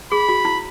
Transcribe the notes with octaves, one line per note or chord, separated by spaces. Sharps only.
G#4 B5
F#4
E4